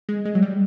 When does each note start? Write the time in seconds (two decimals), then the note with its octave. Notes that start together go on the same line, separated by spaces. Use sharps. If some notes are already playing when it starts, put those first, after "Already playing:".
0.09 G#3
0.25 G#3
0.35 F#3
0.42 G3